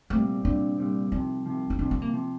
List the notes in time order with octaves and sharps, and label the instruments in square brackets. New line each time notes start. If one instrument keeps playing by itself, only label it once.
[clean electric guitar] C2 A#2 G3 C4 [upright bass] A3
[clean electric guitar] C2 A#2 G3 C4 [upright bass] D4
[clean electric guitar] C2 A#2 G3 C4
[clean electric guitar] C2 C3 F3 [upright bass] D#4
[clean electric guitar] C2 C3 F3
[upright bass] D#4
[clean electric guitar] C2 C3 F3 [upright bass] D4
[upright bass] C4
A#3
[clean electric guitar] C3 F3